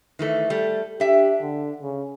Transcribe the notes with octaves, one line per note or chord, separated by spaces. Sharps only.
D#3 E3 A3
G3 A3 A4
D4 G4 E5
D3
C#3